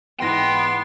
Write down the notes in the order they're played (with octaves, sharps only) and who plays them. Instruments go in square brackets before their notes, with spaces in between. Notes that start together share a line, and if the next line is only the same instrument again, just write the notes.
[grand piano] G#2 E3 A#6 [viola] B3 [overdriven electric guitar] G5 [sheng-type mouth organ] C6